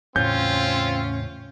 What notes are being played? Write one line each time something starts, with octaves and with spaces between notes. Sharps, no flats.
E2 A2 C#3 C4 C#4 F4 G6